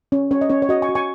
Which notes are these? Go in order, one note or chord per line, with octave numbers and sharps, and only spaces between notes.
C#4
C#4 C#5
D#5
C#4 C#5
C#5
F#4 D#5
G#5 C#6
F#4
G#5 C#6